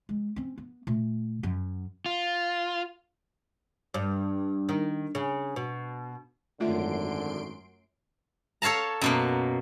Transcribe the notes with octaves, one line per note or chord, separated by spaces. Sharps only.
G#3
C4 C#4
B3
A#2 A3
F#2 F#3
F4
G2
D#3
C#3
B2
G#1 F#2 D3 A3 F4 E5 C6 D7
A4 C#5 F5 A5 A#5
F#2 B2 A#3